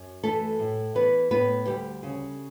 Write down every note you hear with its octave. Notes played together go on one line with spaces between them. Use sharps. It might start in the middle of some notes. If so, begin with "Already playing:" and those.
Already playing: F#2
E3 A3 A4
A2
E3 B3 B4
A2 B3 B4
D2 G3 G4
C#3